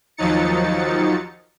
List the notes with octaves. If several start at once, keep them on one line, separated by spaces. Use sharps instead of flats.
D#2 F3 F#3 D#4 A6 C#7